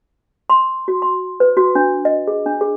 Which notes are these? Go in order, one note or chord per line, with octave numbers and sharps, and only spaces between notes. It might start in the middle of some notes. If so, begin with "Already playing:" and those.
C6
F#4
C6
B4
F#4
D4
D#5
G#4
D4
G#4